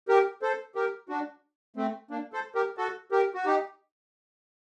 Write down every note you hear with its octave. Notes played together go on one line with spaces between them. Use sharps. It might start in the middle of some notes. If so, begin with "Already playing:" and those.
G4 A#4
A4 C5
G4 A#4
D4 F#4
A3 C4
A#3 D4
A4 C5
G4 A#4
F#4 A4
G4 A#4
F#4
D#4 G4